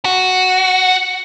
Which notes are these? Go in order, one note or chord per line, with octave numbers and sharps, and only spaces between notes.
F#4